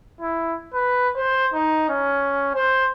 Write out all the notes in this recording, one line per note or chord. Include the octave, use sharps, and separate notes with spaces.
E4
B4
C5
D#4
C#4
C5